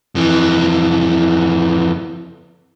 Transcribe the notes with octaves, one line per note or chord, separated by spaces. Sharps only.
F2 E3